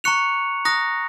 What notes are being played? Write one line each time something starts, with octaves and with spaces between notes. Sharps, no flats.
A#5 C#6 F#6 C#7 F7
A#5 D#6 F#6 A#6